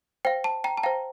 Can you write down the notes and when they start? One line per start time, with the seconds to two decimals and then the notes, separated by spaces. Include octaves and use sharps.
0.25 C5 F5 G5
0.44 A5
0.64 G5 A#5
0.77 A5
0.83 C5 F5 G5 A#5